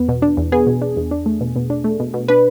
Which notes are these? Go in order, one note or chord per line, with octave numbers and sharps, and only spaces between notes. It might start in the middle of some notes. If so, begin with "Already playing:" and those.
Already playing: E2 B3
B2
D4
E2
B3 G#4
B2
D4
E2
D4
A3
B2
B2
D4
A3
B2
B2
D4 B4